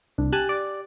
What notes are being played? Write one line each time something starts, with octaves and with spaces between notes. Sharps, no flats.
C2 D4
G4 G#5 A5 F#6
D5